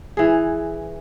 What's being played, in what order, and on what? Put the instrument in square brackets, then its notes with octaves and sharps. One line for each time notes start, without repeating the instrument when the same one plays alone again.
[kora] E3 G#4